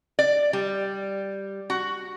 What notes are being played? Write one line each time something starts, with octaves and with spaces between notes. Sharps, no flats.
D5
G3
F#4